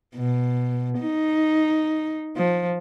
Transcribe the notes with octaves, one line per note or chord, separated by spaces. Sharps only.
B2
D#4
F3